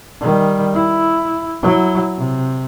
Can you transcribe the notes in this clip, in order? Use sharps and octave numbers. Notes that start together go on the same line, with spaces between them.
D#3 G3
E4
F#3 E4
C3